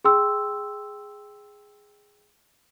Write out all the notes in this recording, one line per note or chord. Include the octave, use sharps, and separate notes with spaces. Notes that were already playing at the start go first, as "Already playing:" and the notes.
G#4 G5 C6 E6